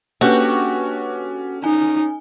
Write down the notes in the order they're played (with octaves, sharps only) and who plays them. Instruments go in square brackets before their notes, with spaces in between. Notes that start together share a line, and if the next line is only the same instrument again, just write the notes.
[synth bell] A#3 D4 B4 [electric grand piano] C#4 A4 [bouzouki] F#4 G4
[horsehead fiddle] D#4 [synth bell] G#5